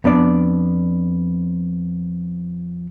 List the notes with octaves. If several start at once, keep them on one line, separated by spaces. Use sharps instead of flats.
F2 B3 D4 D5